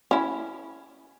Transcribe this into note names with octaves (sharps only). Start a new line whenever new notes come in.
C#4 E4